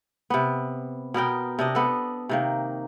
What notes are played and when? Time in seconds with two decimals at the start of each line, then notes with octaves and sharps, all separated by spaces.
0.30 C3 B3
1.14 B2 B3 A#4 G5
1.59 C3 D4 D#5
1.75 B3 A4
2.29 C3 D#3 A#3